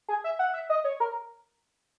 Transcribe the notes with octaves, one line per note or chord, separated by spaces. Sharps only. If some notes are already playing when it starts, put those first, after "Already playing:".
G#4
E5
F#5
E5
D#5
C#5
A#4